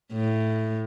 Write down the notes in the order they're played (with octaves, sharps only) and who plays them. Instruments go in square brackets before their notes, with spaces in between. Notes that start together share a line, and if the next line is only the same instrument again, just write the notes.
[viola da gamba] A2